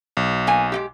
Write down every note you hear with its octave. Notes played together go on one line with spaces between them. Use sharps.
B1
A#3 G#5
G#3 A#3 G4